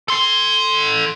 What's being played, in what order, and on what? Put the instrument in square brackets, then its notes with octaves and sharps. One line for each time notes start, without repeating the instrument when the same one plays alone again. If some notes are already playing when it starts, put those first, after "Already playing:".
[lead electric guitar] A4 C6